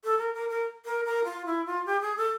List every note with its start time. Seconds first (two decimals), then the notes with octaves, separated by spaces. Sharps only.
0.04 A4
0.18 A#4
0.34 A#4
0.49 A#4
0.85 A#4
1.05 A#4
1.25 F4
1.46 E4
1.66 F4
1.86 G4
2.01 G#4
2.17 A4